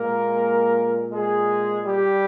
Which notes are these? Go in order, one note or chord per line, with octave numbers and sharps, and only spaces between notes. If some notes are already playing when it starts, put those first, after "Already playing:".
Already playing: A#2 G#3 A#3 A#4
G#3 G#4
G3 G4